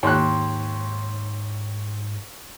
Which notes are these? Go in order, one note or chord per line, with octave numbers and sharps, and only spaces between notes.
D#2 G#2 C#5 C6 F#6